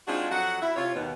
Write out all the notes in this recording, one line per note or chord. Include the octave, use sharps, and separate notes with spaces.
G#3 C4 D4 D#4 F4 F#4
F2 F#3 F#4 F#5
E4
C3 F4 C#5
D#2 B2